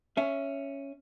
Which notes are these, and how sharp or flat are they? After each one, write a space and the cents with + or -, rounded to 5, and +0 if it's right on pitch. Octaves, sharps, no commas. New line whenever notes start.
C#4 +0 E5 +15